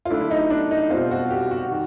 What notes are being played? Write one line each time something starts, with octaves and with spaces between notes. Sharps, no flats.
F4
D3 F#3 A3 D4 E4
E4
D#4
D4
D#4
B2 G3 C4 F4
F#4
G4
F#4
D#3